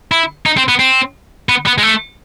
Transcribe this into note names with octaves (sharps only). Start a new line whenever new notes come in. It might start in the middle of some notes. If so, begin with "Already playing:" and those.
E4
D#4
C4
B3
C4
B3
B3
G#3
A3